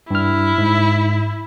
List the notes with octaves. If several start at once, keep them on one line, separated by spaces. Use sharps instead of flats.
G2 E4 F6
G#2